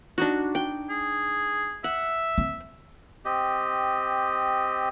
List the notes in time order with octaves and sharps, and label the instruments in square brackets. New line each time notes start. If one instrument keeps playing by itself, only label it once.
[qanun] D4 D#4 F#4
G5
[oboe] G#4
[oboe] E5 [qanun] F#5
[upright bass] C4
[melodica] C4 G4 D#5